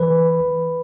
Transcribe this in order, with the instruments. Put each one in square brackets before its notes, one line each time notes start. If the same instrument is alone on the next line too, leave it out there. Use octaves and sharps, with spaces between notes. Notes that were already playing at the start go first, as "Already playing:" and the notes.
Already playing: [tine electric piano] E3 B4